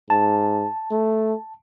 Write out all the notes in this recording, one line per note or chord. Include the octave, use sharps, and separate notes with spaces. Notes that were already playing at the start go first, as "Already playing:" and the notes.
G#2 A5
A3